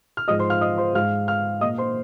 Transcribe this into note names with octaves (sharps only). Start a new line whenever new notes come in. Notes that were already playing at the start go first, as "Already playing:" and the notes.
F6
G#2 F3 G#3 D#5 D#6
C5 C6
F5 F6
D#5 D#6
C5 C6
G#2 G#3 F5 F6
F5 F6
A#2 A#3 D#5 D#6
C5 C6